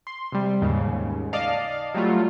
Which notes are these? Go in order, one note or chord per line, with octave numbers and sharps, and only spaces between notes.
C6
C3 G3
D#2 G#2 C#3
D5 D#5 F5 A5
F#3 G3 A3 F4